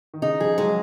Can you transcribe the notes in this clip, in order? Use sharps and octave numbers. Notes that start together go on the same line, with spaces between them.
D#3
C#3 D#4
F3 G#4
F#3 G#3